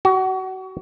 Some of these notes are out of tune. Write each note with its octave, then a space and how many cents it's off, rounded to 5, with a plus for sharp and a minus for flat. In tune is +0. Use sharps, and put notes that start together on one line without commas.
F#4 +30